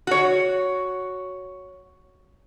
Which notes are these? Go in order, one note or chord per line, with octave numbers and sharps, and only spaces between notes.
F#4 C#5